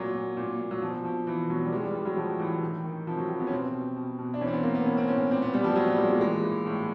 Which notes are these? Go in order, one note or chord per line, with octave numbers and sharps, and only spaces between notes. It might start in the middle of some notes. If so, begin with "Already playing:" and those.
Already playing: A#2 F#3
A#2
A#2
A#2
F#3
B2 F3
B2 F3
B2 E3
B2 F#3
G3
E3 G#3
G3
E3 G3
F#3
A2 F3
A2 E3
D#3
D#3
C3 F3
F#3
C3
B3
C#4
B2 C4
B2
B2
B2
D4
E3 C#4
C4
B3
E3 A#3
B3
A2 C#4
C4
A2 C#4
A#2 C4
B3
A#2 G3
F3
A#2 F#3
G3
A#2 G#3
F#3
E3 G#3
E3
A2